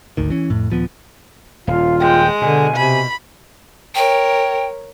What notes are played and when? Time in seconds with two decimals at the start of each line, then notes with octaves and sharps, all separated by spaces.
0.17 G#1 D2 D#3
0.30 E3 C#4
0.50 F2 A2
0.70 D#1 F3 B3
1.67 D#1 F4 F5
2.00 G#3 G5
2.42 B2 D3 G#5
2.76 C3 B5
3.95 A#4 C#5 G5